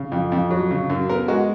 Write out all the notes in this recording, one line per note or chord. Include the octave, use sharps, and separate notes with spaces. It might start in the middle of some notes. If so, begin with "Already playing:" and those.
Already playing: C#3
F2
F2
F#3
C#3
F#2
B3 A#4
G#3 F#4